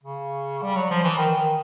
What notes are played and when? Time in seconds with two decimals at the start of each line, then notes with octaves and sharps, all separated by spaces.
0.03 C#3
0.62 G3
0.76 F#3
0.91 F3
1.04 E3
1.18 D#3
1.37 D#3